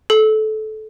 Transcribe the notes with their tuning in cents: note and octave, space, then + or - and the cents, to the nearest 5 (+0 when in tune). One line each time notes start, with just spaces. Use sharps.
A4 -20